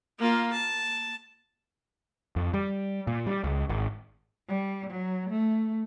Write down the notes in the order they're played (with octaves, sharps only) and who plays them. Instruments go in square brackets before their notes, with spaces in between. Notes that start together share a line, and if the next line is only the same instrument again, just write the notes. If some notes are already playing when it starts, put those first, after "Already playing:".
[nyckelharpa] A#3 F4
A5
[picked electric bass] F2
G3
A#2
G3
C#2
G#1
[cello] G3
F#3
A3